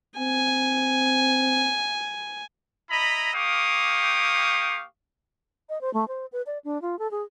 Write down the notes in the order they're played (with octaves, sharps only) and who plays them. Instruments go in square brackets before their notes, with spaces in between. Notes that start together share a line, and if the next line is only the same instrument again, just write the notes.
[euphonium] C4 [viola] G#5
[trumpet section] E4 D#5 A#5 B5
A#3 G4 F5 G5 C#6 D#6
[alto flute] D#5
C5
A3
C5
B4
D5
D4
F4
A4
G#4